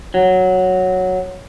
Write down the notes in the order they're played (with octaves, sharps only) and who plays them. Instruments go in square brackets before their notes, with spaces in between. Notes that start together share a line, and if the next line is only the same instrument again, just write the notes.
[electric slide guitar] F#3